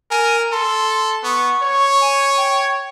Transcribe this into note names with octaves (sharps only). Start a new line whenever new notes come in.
A#4 G#5
A4 C6
B3 C#6
C#5
G#5
G5